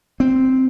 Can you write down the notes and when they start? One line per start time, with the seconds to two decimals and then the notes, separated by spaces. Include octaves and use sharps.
0.20 C4